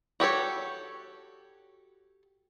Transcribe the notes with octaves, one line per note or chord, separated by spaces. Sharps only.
F#4 G4 A4 C#5